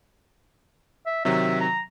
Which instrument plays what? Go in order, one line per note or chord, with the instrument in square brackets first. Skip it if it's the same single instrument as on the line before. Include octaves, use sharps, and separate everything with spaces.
[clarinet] E5
[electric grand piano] C3 D#3 F#3 [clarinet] E5
[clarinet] A#5